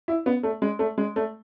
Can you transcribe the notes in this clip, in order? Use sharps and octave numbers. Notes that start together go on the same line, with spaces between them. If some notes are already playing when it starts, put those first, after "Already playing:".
E4
B3
A3
G#3
A3
G#3
A3